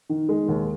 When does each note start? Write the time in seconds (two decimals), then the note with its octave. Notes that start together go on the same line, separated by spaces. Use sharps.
0.09 D#3
0.29 G#3
0.48 D#2